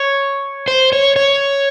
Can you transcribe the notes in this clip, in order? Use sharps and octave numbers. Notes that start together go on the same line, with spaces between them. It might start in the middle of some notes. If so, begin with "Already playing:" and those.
Already playing: C#5
C5
C#5
C#5